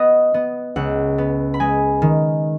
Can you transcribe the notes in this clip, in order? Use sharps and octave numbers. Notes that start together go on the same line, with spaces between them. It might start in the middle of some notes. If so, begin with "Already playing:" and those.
Already playing: B3 D#5 F#5 B5
B3
C#2 F#5
B3
B5
G#3 G#5
D#3